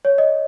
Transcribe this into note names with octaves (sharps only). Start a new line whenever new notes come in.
C#5
D#5